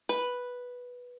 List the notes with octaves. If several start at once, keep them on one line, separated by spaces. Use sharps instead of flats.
B4